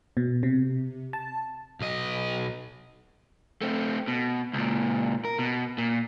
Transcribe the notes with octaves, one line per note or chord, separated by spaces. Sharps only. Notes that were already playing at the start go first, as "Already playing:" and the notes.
B2
C3
A5
B1 D#5
A3 C4
B2
C#2 A#2
A#4
B2
A#2